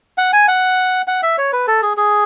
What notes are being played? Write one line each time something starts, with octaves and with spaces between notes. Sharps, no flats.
F#5
G#5
F#5
F#5
E5
C#5
B4
A4
G#4
G#4